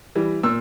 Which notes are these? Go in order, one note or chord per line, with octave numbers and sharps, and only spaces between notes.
E3 G3
A#2 E6